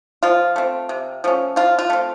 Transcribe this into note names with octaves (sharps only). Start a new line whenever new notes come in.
F3 F4
A3 C4
C3
F3 A3 C#4
F3 F4
F4
A3 C4